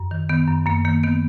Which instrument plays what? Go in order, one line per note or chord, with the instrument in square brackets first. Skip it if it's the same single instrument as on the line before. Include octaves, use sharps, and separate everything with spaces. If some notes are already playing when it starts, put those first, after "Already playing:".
Already playing: [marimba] F#2
D#3
D#3 B3
F#2
F#2 A#3
D#3 A#3
D#3 B3